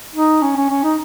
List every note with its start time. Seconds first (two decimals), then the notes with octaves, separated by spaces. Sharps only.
0.14 D#4
0.42 C#4
0.56 C#4
0.70 C#4
0.83 D#4